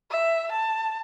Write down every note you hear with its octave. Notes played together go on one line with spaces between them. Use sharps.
E5
A5